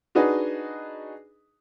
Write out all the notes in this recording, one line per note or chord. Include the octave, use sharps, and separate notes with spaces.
D4 D#4 F#4 G#4 B4 D#5